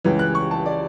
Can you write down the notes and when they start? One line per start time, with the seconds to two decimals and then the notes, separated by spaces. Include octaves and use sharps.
0.04 C#2 C#3 E3
0.19 F#6
0.35 C#6
0.51 A5
0.66 D5